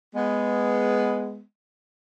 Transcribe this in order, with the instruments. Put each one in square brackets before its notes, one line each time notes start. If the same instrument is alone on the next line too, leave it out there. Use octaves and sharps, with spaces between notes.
[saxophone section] G#3 B3